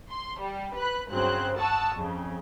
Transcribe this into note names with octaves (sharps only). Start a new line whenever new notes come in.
C6
G3
B4 B5 F#6
G2 C#3 F#3 C4 C5 F#6
F#5 A5 C#6 D#6 E6
F2 C#3